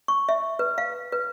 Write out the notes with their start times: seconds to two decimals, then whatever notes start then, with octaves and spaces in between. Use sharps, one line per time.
0.08 C#6
0.29 E5
0.59 B4
0.78 F5
1.12 B4